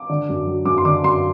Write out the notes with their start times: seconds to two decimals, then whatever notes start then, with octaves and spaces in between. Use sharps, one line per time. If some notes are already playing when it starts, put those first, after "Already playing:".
Already playing: D6
0.09 D3
0.29 F#2
0.47 F#3
0.65 F#2 D6
0.78 C6
0.85 D3 D6
1.03 F#2 C6